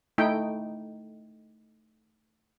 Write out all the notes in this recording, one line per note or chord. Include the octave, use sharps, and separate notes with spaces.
A3 D#4 E4 G5